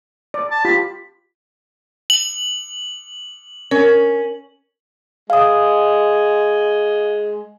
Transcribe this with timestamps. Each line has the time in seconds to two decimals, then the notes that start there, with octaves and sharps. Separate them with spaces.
0.34 D5
0.51 A5
0.65 F4 G4 B5
2.10 F#7
3.71 C#4 A#4
5.30 G#3 F5 D#6